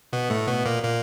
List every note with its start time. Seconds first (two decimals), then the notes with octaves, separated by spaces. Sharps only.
0.13 B2 B3
0.30 A2 A3
0.47 B2 B3
0.65 A#2 A#3
0.83 A#2 A#3